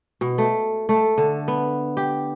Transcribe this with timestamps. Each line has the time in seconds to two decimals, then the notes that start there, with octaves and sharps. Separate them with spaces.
0.21 B2
0.38 A3
0.89 A3
1.18 D3
1.48 B3
1.97 G4